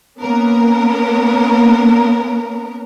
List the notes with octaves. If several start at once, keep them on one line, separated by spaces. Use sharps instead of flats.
A#3 B3 C#4 A#4